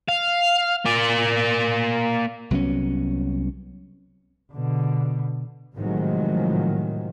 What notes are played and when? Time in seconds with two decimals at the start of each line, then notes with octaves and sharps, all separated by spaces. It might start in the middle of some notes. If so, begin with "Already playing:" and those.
0.08 F5
0.85 A#3 D5
2.51 C2 F#3 B3 C#4
4.53 B2 D3
5.76 A2 C3 D#3 F3 F#3 G#3